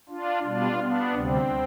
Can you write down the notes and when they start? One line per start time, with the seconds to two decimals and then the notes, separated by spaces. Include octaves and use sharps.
0.09 D4 F4
0.43 B2 G3 D4 F4
0.78 B3 D4
1.12 D2 C3 G3 C4